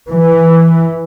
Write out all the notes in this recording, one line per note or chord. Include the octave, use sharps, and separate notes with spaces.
E3